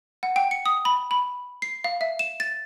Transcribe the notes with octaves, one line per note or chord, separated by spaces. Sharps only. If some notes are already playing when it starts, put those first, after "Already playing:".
F#5
G5
C#7
D#6
B5
B5
C7
F5
E5
E7
A6